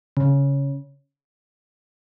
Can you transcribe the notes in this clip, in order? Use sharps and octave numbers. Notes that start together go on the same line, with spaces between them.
C#3